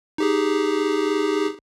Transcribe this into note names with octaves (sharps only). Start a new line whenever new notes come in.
D#4 G4 G#4